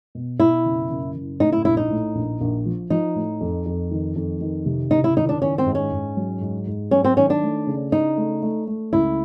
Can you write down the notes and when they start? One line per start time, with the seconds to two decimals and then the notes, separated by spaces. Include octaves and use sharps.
0.15 B2
0.40 B2 E4
0.65 F#1
0.90 F#1
1.15 F#1
1.40 A2 D#4
1.52 E4
1.65 A#1 E4
1.77 D#4
1.91 A2
2.15 A#1
2.41 A#1
2.66 F3
2.90 F3 D#4
3.15 A2
3.41 F2
3.66 F2
3.91 D#3
4.16 F2
4.41 D#3
4.66 C3
4.91 F#1 D#4
5.04 E4
5.17 D#3 D#4
5.29 D4
5.41 D#3 C#4
5.58 C4
5.66 G#2
5.75 C#4
5.92 G#2
6.17 F#3
6.41 G#2
6.67 G#2
6.91 F#3 C#4
7.05 C4
7.17 D#3 C#4
7.30 D4
7.43 A3
7.67 C#3
7.92 C#3 D#4
8.17 A3
8.43 A3
8.67 A3
8.93 C#2 E4